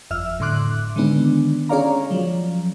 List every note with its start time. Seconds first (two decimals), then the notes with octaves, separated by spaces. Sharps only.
0.10 G1 F2 E5 E6 F6
0.40 A2 D3 C6 D6 F#6
0.96 D3 D#3 G#3 B3 D4
1.69 C#4 G#4 C#5 D5 F5 A#5
2.11 F3 F#3